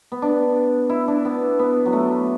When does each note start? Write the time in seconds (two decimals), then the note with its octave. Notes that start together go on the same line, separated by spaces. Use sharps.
0.12 B3
0.22 D4
0.89 E4
1.08 D4
1.25 B3
1.59 B3
1.85 F#3
1.93 A3